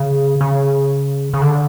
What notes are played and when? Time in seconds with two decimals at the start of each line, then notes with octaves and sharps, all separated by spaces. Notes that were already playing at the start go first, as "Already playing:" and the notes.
Already playing: C#3
0.41 C#3
1.34 C#3
1.42 D3